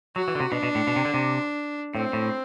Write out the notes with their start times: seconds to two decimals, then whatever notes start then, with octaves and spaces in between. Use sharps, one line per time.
0.16 F#3 F#4
0.28 E3
0.35 D3
0.40 C3
0.51 B2 D4
0.63 B2
0.75 A2
0.87 B2
0.96 C3
1.05 D3
1.14 C3
1.94 A2 C4
2.13 A2